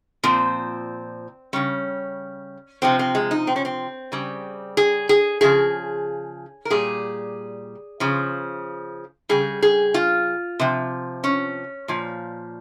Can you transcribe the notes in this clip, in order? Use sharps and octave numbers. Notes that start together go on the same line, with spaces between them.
A#2 F3 C4
C#3 G3 C#4
C3 F3 C4
C4
G#3
D#4
C4
C#4
C4
C#3 G3
G#4
G#4
C#3 F3 G#4
A#4
A#2 G3 G#4
C#3 F3
C#3 G3 G#4
G#4
F4
C3 F3
C#4
A#2 F3